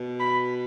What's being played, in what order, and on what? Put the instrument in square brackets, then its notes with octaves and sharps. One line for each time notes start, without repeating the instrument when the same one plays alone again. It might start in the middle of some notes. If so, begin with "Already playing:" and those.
Already playing: [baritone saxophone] B2
[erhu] B5